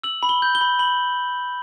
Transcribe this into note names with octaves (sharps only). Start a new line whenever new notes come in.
E6 F#7
B5
G7
G6
G7
B5
B5 F#7